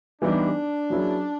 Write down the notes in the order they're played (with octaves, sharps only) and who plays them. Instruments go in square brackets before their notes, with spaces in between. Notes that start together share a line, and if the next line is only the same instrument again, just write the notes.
[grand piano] E3 G3 B3 D#4 G4 [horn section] D4
[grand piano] F#3 A#3 C#4 E4 G#4